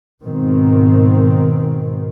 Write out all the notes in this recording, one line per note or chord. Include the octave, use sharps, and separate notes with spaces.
G#2 B2 D#3 C4